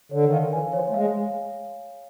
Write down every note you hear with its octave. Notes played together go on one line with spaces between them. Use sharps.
D3 C#5
D#3
F5
D3
E3 G#5
F3 C#5
A3
G#3 F5